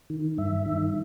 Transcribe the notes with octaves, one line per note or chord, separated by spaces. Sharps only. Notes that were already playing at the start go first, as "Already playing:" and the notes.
D#3
G2 E5
D#3